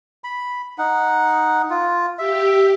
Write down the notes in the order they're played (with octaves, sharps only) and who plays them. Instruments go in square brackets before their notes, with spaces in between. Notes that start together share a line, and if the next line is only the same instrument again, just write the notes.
[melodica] B5
D#4 F#5
F4
[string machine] G4 [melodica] E5